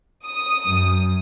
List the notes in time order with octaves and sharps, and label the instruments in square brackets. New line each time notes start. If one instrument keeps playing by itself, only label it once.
[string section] D#6
[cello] F#2